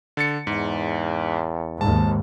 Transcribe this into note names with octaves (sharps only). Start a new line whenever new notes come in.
D3 A6 C#7
E2 G#2
D#2 G#2 A5